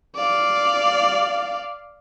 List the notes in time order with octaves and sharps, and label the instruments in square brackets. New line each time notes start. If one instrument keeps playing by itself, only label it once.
[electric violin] D5 F5